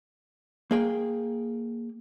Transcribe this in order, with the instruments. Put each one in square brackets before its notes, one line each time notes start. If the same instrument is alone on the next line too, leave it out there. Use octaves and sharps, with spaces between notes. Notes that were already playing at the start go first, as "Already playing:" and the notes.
[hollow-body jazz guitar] A#3 G#4 G5